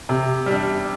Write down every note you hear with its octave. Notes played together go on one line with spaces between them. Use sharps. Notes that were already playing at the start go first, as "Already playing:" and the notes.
C3
G3 D4